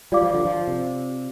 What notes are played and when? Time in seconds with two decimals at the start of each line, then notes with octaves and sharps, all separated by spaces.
0.12 G3 F4 D5 F5 D6
0.23 F3
0.34 D3
0.45 F3
0.67 C3